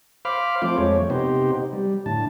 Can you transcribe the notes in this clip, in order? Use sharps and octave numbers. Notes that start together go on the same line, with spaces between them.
C5 F5 B5 D6 F6
F3 A3 C4 F4 C5 D6
F2 G#3 A3 C#5
C3 B3 D#4 G4 C5
G3
A2 D3 A5